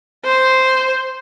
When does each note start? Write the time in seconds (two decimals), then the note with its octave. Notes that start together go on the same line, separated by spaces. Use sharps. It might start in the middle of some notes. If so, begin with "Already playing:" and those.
0.25 C5